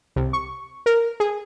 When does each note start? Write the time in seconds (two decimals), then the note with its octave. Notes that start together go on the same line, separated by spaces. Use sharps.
0.16 C2
0.33 C#6
0.86 A#4
1.20 G#4